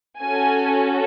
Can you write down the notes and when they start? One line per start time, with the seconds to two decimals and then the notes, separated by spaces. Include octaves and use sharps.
0.21 C#4 F#4 A4 G#5